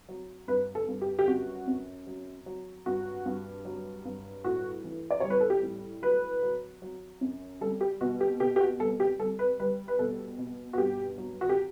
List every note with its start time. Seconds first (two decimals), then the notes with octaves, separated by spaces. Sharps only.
0.09 F#3
0.48 G2 B4
0.75 A4
0.88 G2
1.01 G4
1.19 G4
1.28 F#2 F#4
1.67 F#2
2.07 F#3
2.46 F#3
2.86 G2 F#4
3.26 G2
3.65 F#3
4.05 G2
4.44 A2 F#4
4.84 E3
5.11 D5
5.20 G3 C#5
5.30 B4
5.41 A4
5.50 G4
5.63 A2
6.02 F#3 B4
6.43 F#3
6.82 F#3
7.21 F#2
7.61 G3 A4
7.81 G4
8.01 B2 F#4
8.21 G4
8.40 B2 G4
8.56 G4
8.60 F#4
8.80 G3 A4
9.00 G4
9.19 G3 A4
9.39 B4
9.60 G3 B4
9.88 B4
9.99 B2 A4
10.38 B2
10.73 F#4
10.78 G2 G4
11.18 F#3
11.41 F#4
11.49 G4